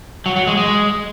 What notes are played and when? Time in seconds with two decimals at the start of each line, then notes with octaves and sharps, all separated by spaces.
0.26 F#3
0.36 F#3
0.47 G#3
0.57 G#3